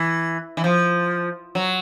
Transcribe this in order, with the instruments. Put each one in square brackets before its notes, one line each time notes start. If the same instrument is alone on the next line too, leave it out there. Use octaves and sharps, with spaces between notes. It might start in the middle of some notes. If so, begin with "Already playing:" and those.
Already playing: [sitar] E3
E3
F3
F#3